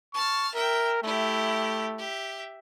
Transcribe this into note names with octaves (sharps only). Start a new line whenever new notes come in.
A5 C#6 F6
A#4 E5 G5
A3 E4 G4
G4 E5